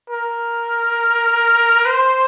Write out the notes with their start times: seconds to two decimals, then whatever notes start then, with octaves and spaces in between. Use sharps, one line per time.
0.10 A#4
1.86 C5